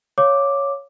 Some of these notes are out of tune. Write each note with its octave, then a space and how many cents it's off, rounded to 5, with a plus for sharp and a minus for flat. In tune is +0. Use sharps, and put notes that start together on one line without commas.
C#5 +0 F5 +0 D6 +0